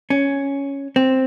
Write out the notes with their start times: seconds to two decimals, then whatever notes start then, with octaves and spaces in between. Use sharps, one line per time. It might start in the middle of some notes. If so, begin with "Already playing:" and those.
0.10 C#4
0.96 C4